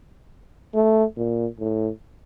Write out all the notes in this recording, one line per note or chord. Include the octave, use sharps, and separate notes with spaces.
A3
A#2
A2